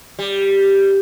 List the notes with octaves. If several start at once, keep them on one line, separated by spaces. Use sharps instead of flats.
G3